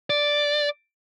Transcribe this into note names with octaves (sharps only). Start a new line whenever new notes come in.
D5